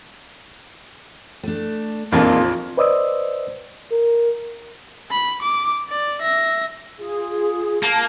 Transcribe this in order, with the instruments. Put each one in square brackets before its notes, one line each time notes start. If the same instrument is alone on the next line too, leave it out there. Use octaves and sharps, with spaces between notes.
[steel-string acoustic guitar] A3 D4
[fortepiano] A#1 F2 D4 [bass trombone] A#3 [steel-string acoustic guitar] C4 D#4 G#4 [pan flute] F4
[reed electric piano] B4 C5 D5 D#5 D#6 E6
[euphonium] A#4
[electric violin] B5
D6
D5
E5 A#6
[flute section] F4 G#4
[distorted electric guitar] A#3 [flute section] A5